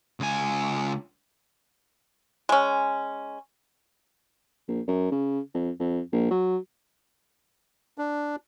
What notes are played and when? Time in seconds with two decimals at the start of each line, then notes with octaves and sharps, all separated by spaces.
0.20 C#2 G#5
2.49 G#3 C#4
4.68 A#1
4.88 F#2
5.12 C#3
5.54 F2
5.79 F2
6.12 A#1
6.31 F#3
7.98 D4